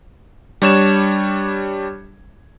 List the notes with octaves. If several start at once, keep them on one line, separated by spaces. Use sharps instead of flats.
G3 D4 C#5 G#6 E7